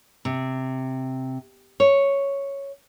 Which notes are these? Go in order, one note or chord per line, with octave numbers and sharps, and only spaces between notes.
C3
C#5